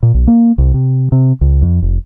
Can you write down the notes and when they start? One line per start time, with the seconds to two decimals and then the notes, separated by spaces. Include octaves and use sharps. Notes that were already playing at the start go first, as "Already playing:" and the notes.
0.03 A#2
0.14 B1
0.27 A#3
0.58 C2
0.74 C3
1.12 C3
1.41 C#2
1.62 F2
1.82 F1